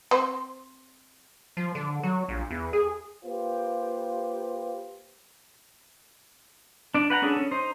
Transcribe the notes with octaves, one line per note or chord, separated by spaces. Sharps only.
C4 C5
F3
D3
F#3
A#1
E2
G#4
A#3 F4 G4 B4 C5
D4 D5
B4 F#5 G5 A#5
C#4 D4 G#4 A4
C#4
D#4 C5